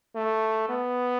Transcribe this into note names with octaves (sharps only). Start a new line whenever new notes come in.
A3
B3